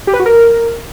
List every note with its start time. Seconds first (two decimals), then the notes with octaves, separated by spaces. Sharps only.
0.07 G4
0.13 B4
0.20 F#4
0.26 A#4